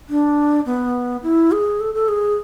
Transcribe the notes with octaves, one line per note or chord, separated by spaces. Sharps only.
D4
B3
E4
G#4
A4
A4
G#4